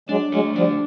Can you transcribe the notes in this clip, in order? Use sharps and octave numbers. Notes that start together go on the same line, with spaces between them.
F#3 G#3 D4
F#3 G#3 A3
F3 G3 D4